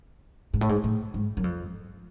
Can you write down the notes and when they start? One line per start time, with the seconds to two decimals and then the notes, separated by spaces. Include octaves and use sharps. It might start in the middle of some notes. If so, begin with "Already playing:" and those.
0.54 G#2
0.61 A2
0.69 G#2
0.84 A2
1.14 G#2
1.37 F#2
1.44 F2